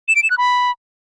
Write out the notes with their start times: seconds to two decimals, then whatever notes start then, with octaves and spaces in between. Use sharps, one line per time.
0.08 E7
0.16 D7
0.23 E7
0.30 F#6
0.38 B5